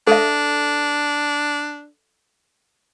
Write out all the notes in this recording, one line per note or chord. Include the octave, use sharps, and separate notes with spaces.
D4 A4 E5